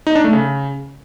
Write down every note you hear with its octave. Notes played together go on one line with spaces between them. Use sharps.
D#4
D4
A3
C#3